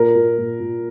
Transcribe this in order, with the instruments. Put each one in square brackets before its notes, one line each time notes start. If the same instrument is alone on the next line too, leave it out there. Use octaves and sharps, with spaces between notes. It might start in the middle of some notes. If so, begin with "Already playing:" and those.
Already playing: [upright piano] A#2 A#4
A#2
A#2
A#2